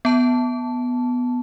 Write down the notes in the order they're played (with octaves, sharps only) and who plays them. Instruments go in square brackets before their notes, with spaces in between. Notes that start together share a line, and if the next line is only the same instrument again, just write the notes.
[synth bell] B3 A5